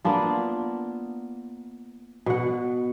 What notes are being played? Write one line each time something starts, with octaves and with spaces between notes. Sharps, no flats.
A#3 B3 D4 F4
B2 F#5